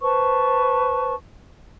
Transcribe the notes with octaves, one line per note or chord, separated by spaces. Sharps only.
B4 C5 A5 C#6